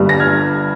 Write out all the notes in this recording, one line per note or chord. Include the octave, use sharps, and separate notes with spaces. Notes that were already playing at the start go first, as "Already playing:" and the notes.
Already playing: G1 G2 G3
A#6
F6 G#6